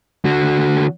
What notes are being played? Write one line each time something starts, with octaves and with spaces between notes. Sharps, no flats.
D3 F#4